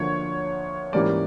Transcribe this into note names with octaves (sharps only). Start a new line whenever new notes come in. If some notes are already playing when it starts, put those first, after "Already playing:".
Already playing: D2 D3 F3 A#3 D4 C#5
G#2 E3 G3 A#3 C#4 D5